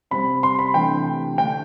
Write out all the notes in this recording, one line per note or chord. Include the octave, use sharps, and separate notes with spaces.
C3 G3 C4 B5
C6
B5
C3 E3 A3 D4 G5
D3 A3 D4 G5